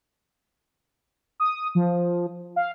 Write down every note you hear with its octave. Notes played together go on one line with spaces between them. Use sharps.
D#6
F3
F5